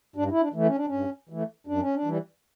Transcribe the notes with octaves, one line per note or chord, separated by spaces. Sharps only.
G2 D4
E4
D4
E3 A3
C#4
D4
C#4
G2
E3 A3
F#2 D4
C#4
D4
E3 G3